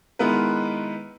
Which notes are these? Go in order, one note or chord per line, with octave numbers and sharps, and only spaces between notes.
D#3 G#3 B3 E4 A#4 B4